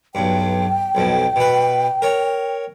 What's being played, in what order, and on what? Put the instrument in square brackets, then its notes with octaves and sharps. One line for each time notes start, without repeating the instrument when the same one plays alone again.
[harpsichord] B1 G2 [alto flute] G5
[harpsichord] B1 F2 B2
B2 B4
A#4 C#5